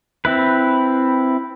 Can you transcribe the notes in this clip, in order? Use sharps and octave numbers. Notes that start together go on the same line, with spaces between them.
C4 E4 B4